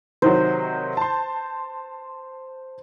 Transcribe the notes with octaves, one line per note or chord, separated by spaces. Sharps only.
C3 D#3 F#3 C5
A5 C6